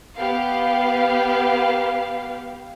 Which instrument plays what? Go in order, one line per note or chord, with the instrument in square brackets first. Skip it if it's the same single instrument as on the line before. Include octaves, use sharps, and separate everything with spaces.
[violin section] B3 G4 F5